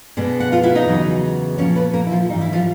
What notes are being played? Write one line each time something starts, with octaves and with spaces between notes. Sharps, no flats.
B2 G#3 B3 D4
F#5
F4 F5
E4 E5
D#4 D#5
E2 C#3 F#3 B3
A#2 F3 A#3 C#4 C#5
B3 B4
A#3 A#4
E4
F3 F4
G#2 E3 G3 D#4
E4
F3 F4